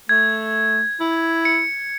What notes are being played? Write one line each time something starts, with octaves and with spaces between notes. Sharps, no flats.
A3 G#6
E4
C#7